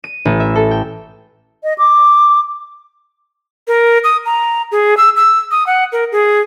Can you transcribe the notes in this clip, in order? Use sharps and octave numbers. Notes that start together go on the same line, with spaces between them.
D#7
A1
E5
A4
G5
D#5
D6
A#4
D#6
A#5
G#4
E6
E6
D#6
F#5
A#4
G#4